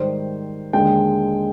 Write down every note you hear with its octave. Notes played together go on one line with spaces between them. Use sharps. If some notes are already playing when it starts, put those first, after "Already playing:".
Already playing: G#2 D#3 G3 C5
D#2 D3 G#3 G5